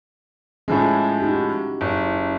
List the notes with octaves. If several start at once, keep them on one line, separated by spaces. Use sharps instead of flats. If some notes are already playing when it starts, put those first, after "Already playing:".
A2 F3 G#3 C#4 E4
D#4 F#4 G4
F#1